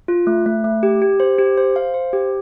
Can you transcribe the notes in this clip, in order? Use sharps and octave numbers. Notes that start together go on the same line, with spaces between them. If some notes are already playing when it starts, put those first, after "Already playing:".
F4
A3
A3
A3
G4
G4
C5
G4
C5
F5
C5
G4